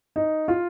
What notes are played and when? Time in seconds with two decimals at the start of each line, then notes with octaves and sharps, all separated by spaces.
0.16 D#4
0.48 F4